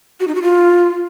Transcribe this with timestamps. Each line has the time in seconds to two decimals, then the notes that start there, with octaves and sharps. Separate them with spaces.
0.20 F#4
0.28 D#4
0.35 F#4
0.42 F4